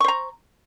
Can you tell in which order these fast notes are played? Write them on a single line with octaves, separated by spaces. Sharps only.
C#6 C5 A#5